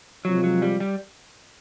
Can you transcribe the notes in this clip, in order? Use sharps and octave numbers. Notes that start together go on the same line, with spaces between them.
C3 F3 F#3 G#3 C4 F4
F#3
G3
G3